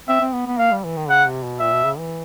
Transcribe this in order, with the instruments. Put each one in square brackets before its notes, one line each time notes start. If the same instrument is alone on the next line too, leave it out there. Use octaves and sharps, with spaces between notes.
[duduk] C4 [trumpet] E5
[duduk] C4
B3
B3
[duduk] A#3 [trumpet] F5
[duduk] G3
E3
D#3
[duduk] C#3 [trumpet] F#5
[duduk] C3
B2
[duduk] A#2 [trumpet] E5
[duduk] B2
C#3
E3